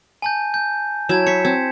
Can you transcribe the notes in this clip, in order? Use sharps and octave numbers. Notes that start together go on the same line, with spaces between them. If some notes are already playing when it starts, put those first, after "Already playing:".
G#5 A5 G6
G6
F#3 E4 A5 G#6 E7
C#5 B6 C#7
C4 G#6